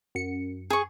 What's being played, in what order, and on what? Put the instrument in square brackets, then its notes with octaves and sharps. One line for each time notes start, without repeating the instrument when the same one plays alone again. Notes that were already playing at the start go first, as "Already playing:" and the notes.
[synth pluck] F#2 C#7
[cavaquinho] G#4 C#6